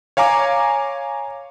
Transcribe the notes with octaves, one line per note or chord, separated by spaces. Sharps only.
C#5 F5 G#5 A#5 D6